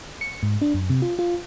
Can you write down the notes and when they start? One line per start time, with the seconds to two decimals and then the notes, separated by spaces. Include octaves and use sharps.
0.21 C#7
0.43 G#2
0.61 D4
0.74 F#2
0.90 C3
1.02 F4
1.19 F4